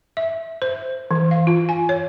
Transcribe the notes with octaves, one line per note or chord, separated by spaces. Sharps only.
E5
C5
E3
F5
F4
G#5
C#5